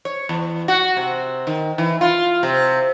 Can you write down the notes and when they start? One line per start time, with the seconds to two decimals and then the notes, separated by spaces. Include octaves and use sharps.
0.05 C#5
0.29 E2
0.68 F#4
0.97 C3
1.47 D#3
1.78 E3
2.01 F4
2.43 C3